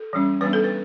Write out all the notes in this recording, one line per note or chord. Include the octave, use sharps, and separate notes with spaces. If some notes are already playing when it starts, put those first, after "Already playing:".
Already playing: A4
E3 G3 C#4
E3 G3 B3 D4 B4
A4
B4